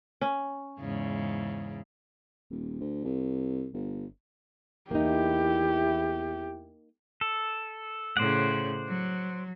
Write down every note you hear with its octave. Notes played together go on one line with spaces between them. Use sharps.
C#4
E2 G#2 C#3
D#1
D2
C2
G1
E2 A#3 D#4 E4 G4
A4
A2 C#3 C5 D5 F#5
F#3